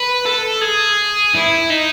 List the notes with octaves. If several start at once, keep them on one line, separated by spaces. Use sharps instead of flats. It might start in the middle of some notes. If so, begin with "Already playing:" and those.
Already playing: B4
A4
G#4
E4
D#4